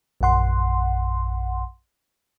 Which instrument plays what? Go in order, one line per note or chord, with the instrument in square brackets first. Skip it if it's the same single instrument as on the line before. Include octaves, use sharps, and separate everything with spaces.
[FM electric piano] A#1 F#2 F#5 C6